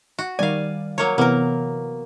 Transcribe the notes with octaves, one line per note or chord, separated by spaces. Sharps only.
F#4
D#3 G3 D5 F5 G#5
F#3 A#3 C#5
C3 E3 A#3 B3 A#4